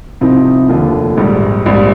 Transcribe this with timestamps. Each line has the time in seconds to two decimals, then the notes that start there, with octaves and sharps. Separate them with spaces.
0.21 C2 C3 F3 C4 D#4
0.69 F1 D#2 D3 F3
1.17 A#1 G#2 G3
1.66 A#1 G#2 G3